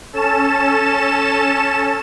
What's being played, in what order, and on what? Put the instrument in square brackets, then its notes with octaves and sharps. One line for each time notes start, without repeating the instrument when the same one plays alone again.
[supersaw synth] C#4 A4 A5 E7